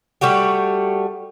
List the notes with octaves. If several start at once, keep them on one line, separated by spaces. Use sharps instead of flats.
G3 A3 F#4 G4